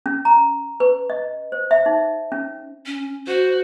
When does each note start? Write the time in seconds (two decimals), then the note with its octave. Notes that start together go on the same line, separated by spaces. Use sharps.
0.06 C#4
0.25 A#5
0.80 B4
1.10 D#5
1.52 C5
1.71 E5
1.86 D#4
2.32 C#4
2.86 C#4
3.27 F#4 C5